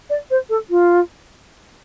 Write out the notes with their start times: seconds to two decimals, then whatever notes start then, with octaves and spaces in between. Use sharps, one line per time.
0.10 D5
0.31 C5
0.49 A4
0.70 F4